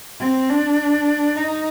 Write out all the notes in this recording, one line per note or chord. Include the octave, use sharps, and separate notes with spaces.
C4
D4
D#4